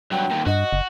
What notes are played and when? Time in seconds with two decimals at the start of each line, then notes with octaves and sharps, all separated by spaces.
0.12 G2 F#3 G5
0.31 D#2 A#2
0.47 G2 F#4 D#5
0.73 F#1